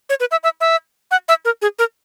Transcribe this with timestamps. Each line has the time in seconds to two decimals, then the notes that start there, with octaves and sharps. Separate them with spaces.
0.09 C#5
0.20 B4
0.31 E5
0.43 E5
0.60 E5
1.11 F#5
1.28 E5
1.45 A#4
1.62 G#4
1.79 A#4